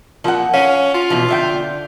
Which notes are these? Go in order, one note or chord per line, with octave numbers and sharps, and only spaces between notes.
A#2 F3 F#5
C#4 F5
F4
B2 E3 F3
D3 E5 G5